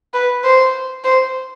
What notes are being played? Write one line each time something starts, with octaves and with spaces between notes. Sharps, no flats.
B4
C5
C5